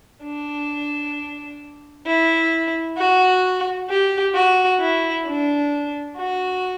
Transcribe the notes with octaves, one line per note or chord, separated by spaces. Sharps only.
D4
E4
F#4
G4
F#4
E4
D4
F#4